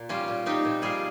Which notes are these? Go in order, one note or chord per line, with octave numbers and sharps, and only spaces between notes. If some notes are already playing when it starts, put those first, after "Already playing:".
Already playing: A#2
G3 C#4 F4
A#2
C4 D#4 G4
A#2
G3 F4 G#4